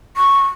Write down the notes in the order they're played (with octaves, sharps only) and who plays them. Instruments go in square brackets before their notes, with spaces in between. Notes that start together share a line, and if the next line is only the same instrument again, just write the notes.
[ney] C#6